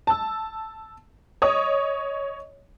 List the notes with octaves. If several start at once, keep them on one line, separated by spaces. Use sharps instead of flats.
A5 E6
C#5 D#5 D#6